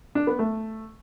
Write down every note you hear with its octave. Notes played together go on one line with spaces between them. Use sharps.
D4
B3
A3